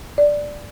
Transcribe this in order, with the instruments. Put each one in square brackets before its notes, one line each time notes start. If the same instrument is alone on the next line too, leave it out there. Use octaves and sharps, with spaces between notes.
[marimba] D5